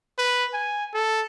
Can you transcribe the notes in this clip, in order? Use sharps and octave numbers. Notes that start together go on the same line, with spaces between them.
B4
G#5
A4